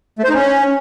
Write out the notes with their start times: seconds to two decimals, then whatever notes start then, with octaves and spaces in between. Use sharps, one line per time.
0.19 A3
0.24 C5
0.29 D#4
0.34 C#4